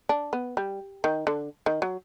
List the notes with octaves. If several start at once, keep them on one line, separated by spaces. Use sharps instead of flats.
D4
B3
G3
D#3
D3
D#3
F#3